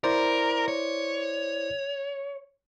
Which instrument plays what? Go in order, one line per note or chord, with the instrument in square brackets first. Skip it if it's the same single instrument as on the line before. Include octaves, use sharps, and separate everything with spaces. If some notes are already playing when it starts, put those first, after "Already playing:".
[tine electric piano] E4 C5 D5 [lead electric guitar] A#4
[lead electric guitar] C#5